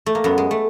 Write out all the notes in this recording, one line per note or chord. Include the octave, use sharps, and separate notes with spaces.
A3
A#3
F#2 B3
G#3
A3